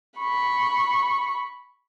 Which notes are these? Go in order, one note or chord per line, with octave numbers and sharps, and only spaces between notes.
B5 C#6